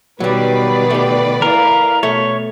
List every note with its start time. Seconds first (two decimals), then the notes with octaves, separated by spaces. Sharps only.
0.20 B2 D#3 F#3 G3 B4 D5
0.90 A3 G4
1.42 E4 A#4 F5
2.03 B2 A3 C#5